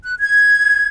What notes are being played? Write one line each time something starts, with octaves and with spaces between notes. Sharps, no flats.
F#6
G#6